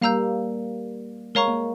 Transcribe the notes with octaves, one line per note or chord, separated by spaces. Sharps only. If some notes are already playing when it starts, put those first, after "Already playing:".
G3 A#3 F5 A#5 E6 G6
G#3 A#4 C#5 F5 A#5 C#6
A#3